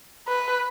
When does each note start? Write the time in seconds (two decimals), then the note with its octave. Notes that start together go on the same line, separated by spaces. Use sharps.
0.28 B4